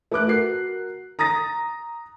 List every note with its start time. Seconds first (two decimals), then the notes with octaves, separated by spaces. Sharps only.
0.11 A3 B4 D6 F#6
0.27 F#4 A#4 C7
1.19 A#5 D#6 A6 A#6